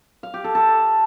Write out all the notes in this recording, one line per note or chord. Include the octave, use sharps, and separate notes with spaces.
F5
G4
A4
A4